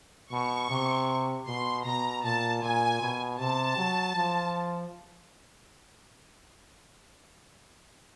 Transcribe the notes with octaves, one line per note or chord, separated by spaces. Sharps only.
B2 C#6
C3
B2 C6
B2 A#5
A#2 A5
A#2 G#5
B2
C3 A5
F#3
F3